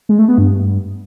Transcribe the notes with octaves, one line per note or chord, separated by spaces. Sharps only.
G#3
A3
B3
G2